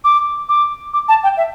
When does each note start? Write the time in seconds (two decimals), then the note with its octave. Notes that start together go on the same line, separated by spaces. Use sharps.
0.04 D6
0.49 D6
0.93 D6
1.08 A5
1.23 G5
1.37 E5